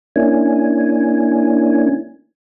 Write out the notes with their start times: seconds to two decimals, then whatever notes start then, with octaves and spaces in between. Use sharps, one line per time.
0.16 A#3 C#4 D4 E4 G#5